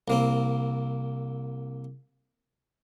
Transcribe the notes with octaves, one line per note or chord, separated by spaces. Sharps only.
C2 A#3 C4